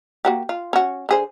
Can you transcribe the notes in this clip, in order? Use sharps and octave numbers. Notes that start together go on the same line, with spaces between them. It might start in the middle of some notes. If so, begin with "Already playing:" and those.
A#3 F#4 G4
F4
C#4 F#4
D3 G#4 C5